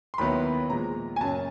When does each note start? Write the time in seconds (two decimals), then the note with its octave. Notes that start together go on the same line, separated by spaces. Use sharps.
0.14 C6
0.18 D#2 D#3 F#3 B3 E4 B5
0.70 A#2 F3 G#3 A#5
1.16 G#5
1.21 F#2 C#3 F#3 A#3 C#4 A5